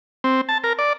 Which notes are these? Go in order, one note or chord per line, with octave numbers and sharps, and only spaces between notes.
C4
A5
A#4
D5